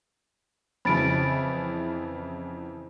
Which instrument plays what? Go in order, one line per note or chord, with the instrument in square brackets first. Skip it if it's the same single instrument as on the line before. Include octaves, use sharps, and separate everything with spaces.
[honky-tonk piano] F2 C#3 E3 [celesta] B5 A6 D7